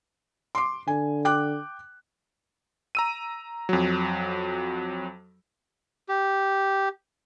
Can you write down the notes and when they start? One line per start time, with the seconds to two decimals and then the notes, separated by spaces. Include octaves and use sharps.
0.55 C6 D6
0.87 D3 G#5
1.25 G5 D6 F#6
2.95 A#5 E6 D#7
3.69 F2 F#3
6.09 G4